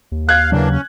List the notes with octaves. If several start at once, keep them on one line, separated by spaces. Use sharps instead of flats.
D#2
F5 F#6 G#6
C#3 E3 F#3 A#3 D4
C#4